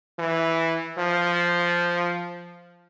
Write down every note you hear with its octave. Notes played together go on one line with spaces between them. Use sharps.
E3
F3